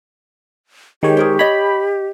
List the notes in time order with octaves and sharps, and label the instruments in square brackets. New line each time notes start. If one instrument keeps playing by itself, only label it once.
[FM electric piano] D#3 G#3 C#5 [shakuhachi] G4
[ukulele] G#4 A#4 C5
[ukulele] C#5 D#5 [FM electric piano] B5